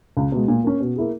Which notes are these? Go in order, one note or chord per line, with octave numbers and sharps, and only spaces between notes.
C#2
B2 G#3
A#2
A#3 C#4
B2
A#3 E4 G#4